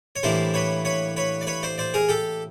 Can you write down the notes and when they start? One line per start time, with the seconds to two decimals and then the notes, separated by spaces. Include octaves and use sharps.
0.16 C#5
0.23 A2 E3 G3 A#3 D4 C5 D5
0.54 B4 C#5
0.85 B4 C#5
1.17 B4 C#5
1.41 D5
1.47 B4 C#5
1.63 C5 D5
1.78 C5 D5
1.94 G#4 A#4
2.09 G4 A4